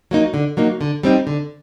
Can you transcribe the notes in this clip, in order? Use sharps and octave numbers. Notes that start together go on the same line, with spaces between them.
F#3 A#3 D#4
D3
F#3 A#3 D#4
D3
G3 C4 D#4
D3